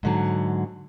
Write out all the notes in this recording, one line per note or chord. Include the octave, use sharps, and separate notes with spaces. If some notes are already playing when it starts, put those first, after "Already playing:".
G#2 D3 F#3